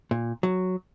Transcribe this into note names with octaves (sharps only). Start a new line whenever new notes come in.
A#2
F#3